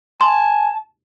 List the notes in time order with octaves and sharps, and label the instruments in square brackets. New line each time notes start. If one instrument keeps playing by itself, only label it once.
[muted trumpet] G#5 [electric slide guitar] A5 [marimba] C6